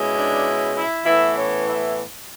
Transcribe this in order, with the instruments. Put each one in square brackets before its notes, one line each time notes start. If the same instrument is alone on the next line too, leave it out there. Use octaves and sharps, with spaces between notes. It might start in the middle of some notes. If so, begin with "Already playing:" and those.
Already playing: [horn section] B2 G#3 C#4 E4
D4 D5
E4 E5
A2 E3 B3 E4 E5
C#4 C#5
E4 E5